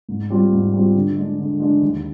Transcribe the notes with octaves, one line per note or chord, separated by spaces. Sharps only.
G#2
G3 C4 F4
G#2
G3 C4 F4
D3
G#3 D4
D3
G#3 D4
D#2